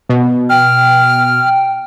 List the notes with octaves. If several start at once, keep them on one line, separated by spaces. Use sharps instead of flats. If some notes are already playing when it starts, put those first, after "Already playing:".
B2
G5 F6